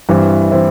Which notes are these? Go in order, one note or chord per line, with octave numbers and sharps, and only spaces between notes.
G2 E3 C4 E4
E3 C4 E4